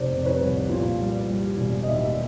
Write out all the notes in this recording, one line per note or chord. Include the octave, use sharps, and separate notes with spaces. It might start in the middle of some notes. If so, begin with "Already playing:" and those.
Already playing: F1 C3 C5 D5
C3
B4 C#5
C2
A#2
G3
G3
E1
D#5
D#2 D5 E5